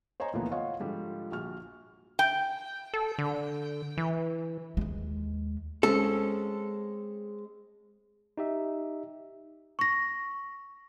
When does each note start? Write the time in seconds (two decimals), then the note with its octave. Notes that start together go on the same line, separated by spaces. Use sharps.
0.20 C5 C#5 D#5 G#5 A#5
0.33 D2 A#2 E3 F3 A#3 B3
0.51 F4 C#5 D#5 F5 F#5
0.80 G#2 D3 F3 G3
1.31 A#1 F#4 F6
2.19 G5
2.94 A4
3.19 D3
3.97 E3
4.77 D#2 G#3
5.83 G#3 C4 C#4 A4
8.37 D#4 G4 E5
9.79 C#6 A#6